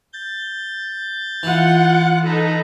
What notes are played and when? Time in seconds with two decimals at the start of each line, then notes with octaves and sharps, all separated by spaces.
0.13 G6 A6
1.43 E3 F4 F#5
2.25 D#4 A4 B4 A#5